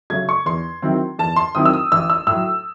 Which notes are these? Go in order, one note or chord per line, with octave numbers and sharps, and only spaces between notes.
C#3 F#3 A3 C#4 G#6
C#6
E2 C6
D#3 F#3 C4 E4
E2 A5
C6
D#3 F#3 C4 E4 D#6
E6
D#6
A1 E6
E6
A2 F#3 E6